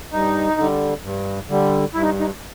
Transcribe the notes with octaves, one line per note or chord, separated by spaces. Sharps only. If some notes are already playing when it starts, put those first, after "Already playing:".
G2 D#4
D3 G3
G2
D3 G3
G2 E4
D#4
D#4